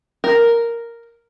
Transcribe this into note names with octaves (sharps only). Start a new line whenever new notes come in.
A#4